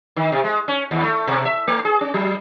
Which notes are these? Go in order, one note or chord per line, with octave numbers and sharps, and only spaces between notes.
D#3
C3
G#3
C#4
D#2
A3
B2
E5
A3
G#4
C#4
F#3